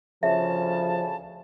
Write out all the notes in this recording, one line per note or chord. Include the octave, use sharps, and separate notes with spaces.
D2 C#3 F3 E5 A5